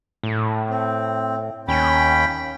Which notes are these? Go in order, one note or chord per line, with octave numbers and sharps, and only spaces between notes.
A2
C4
D#2 C#4 G5 B5